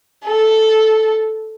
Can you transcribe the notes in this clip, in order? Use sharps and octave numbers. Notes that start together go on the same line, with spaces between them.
A4